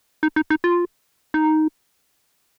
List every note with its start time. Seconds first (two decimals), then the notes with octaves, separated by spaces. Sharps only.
0.23 D#4
0.36 D#4
0.50 D#4
0.64 F4
1.34 D#4